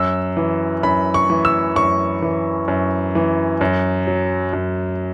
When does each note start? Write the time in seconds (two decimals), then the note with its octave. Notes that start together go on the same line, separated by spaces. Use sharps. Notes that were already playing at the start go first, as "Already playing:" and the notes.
Already playing: F#2 E6
0.37 E3
0.83 F#2 B5
1.14 C#6
1.30 E3
1.45 E6
1.76 F#2 C#6
2.22 E3
2.68 F#2
3.15 E3
3.61 F#2
4.07 F#3
4.53 F#2